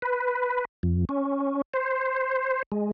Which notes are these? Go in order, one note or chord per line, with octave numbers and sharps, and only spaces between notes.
B4
F2
C#4
C5
G#3